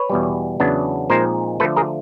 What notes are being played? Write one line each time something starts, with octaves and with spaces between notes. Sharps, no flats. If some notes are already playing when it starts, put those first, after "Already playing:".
Already playing: B4 C#5
E2 B2 G3
E2 C#3 F#3 B3 D4
A#2 F3 G#3 C4 D#4 A#4 C5
D3 F3 A3 A4 B4
G#4 A#4